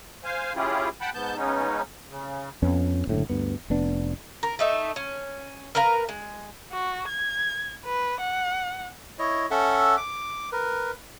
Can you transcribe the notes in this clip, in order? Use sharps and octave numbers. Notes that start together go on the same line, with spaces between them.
C5 F5 G#5
C#4 E4 F4 G4 G#4
F#5 G5 A5 B5
G#2 B3 A5 G6
C#3 G#3 B3 C#4 D#4
C#3
F2 B3 C#4
F#1 A2 D3
D2 G2 B3
F1 B3 D4
A#4
A3 D#4 E5
C#4
A#4 B4 F5 A#5
G#3
F#4
G#6
B4
F#5
E4 C#5 D#5
C#4 A4 E5 F#5
D6
A#4 B4